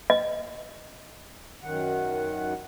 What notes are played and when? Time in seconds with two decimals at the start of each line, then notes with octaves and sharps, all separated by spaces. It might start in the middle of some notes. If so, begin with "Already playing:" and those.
0.10 D#5
1.63 F#2 D#3 F#5